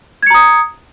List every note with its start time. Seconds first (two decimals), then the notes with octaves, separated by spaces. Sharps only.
0.23 G#6
0.27 C#7
0.30 A#5
0.34 D#6